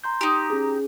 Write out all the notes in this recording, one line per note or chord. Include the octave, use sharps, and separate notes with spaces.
A#5 C6 G6
D#4 G4
C#4 G#4